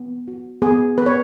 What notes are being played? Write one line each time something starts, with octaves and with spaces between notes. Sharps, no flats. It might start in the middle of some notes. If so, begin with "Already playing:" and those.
Already playing: B3
F#4
B3 G#4
B3 B4
C#5